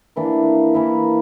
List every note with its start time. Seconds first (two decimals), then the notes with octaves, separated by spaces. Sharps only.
0.16 E3 A#3 D4 A#4
0.74 E3 A#3 E4 A#4